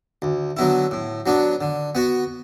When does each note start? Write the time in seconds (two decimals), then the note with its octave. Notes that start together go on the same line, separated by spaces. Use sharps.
0.22 D2
0.57 D3 F#3 B3 E4
0.91 A2
1.26 F#3 B3 D4
1.61 D3
1.95 B3 F#4